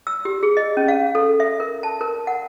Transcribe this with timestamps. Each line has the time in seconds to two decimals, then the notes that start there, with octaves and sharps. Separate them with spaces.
0.07 E6
0.25 G4
0.43 G#4
0.57 D#5
0.77 C#4
0.88 F5
1.15 A4
1.40 E5
1.60 A#4
1.83 A5
2.01 A#4
2.27 F#5